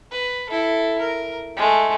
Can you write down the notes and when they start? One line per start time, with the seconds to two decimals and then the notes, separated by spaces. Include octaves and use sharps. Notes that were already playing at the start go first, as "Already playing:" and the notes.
0.11 B4
0.49 E4 A4
0.99 A#4
1.57 G#3 A3